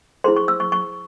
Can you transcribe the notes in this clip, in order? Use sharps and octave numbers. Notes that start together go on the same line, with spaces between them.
E4 G#4 C5 C6
C#6
E6
C#6
C#6